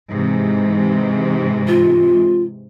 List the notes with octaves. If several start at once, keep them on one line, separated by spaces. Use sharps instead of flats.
G#2 C3 E3
F4